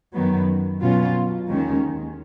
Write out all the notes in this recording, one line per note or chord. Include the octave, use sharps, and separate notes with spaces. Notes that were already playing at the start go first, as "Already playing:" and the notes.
F#2 D#3 F#3 B3
B2 F#3 C#4 F4
D#2 D#3 G#3 C#4